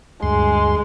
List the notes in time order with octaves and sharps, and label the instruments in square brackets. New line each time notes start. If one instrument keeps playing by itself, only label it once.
[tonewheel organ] D2 G2 C6 [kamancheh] G#3